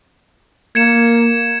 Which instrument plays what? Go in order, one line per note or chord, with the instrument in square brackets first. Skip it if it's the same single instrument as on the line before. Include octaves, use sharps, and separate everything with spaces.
[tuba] A#3 [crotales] G#6 C#7 E7